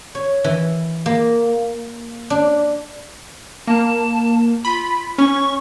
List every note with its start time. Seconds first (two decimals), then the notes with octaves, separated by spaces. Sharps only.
0.15 C#5
0.44 E3
1.06 A#3
2.30 D4
3.67 A#3 A5
4.65 F4 B5
5.18 C#4 C#6